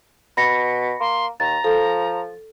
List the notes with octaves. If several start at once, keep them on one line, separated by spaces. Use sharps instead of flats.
B2 B5 A#6 C#7
A#3 C6
D#2 A#5 A6
F3 A4